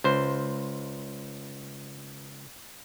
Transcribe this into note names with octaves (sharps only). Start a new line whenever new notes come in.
C#2 C5